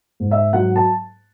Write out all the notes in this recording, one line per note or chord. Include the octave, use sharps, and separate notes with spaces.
G#2
E5
F#3 F#5
A5